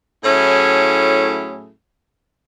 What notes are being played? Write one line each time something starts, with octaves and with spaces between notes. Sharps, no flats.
A2 F#3 A3 C#4 E4 G#4